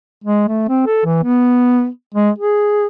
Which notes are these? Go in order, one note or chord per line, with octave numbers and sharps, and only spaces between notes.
G#3
A3
C4
A4
E3
B3
G#3
G#4